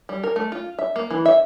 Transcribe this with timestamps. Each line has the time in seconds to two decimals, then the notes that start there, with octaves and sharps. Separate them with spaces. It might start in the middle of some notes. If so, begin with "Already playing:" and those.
0.09 G3
0.24 A#4
0.36 A3
0.52 F4
0.79 E5
0.96 A#3
1.11 E3
1.26 E5